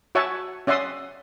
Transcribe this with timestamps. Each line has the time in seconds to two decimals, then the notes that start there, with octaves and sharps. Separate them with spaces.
0.15 F#4 C#5 E5 F#5 G#5 A5
0.67 C#4 D5 E5 F#5 C6 D#6